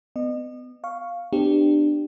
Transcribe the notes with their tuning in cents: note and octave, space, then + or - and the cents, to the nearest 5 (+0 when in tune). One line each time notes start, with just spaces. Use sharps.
B3 +35 D#5 -35
F5 +0 C#6 +0
B3 +45 D4 +20 G4 +0